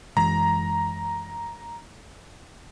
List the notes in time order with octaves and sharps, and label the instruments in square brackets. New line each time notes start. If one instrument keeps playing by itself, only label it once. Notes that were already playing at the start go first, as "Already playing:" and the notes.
[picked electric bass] F#2 E3 G#3 [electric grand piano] A#5